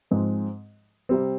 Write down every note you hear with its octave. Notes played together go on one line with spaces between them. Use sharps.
G#2 F3 G#3 C4
C3 G3 C4